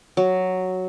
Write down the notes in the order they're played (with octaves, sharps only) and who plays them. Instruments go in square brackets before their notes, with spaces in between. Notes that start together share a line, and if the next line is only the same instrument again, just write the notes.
[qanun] F#3